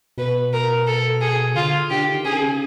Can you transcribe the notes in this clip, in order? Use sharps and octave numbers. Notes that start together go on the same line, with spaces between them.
B2 B4
A#4
A4
G#4
D3 F4
D3 G4
D#3
C#3 G#4
C#3